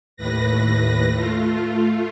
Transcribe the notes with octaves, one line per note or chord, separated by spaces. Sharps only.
D#2 A2 B4 A#6
A3 F4